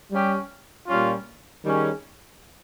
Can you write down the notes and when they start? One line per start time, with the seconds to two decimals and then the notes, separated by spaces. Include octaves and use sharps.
0.12 G3 C#4 G4
0.88 A#2 G3 C#4 F4
1.64 D#3 G3 C#4 G#4